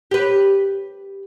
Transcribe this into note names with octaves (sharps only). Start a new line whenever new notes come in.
G4 B4